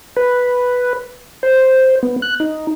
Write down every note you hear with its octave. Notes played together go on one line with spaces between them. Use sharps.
B4
C5
B3
F#6
D#4